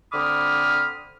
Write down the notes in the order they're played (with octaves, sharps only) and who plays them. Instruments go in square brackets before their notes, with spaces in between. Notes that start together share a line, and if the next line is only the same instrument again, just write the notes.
[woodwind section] D3 C4 B5 D6 D#6 F6